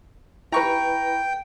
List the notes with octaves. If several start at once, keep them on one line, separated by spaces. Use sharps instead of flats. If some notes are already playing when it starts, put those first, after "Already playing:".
E4 B4 G5 A#5 C#6